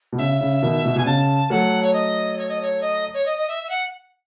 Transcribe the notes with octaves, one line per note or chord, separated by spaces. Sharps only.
B2
C#3 E5
C#3
B2 D#3
B2
B2 G#5
C#3 A5
F#3 A3 F#5
C#5
D#5
C#5
D#5
C#5
D#5
C#5
D#5
D#5
E5
E5
F#5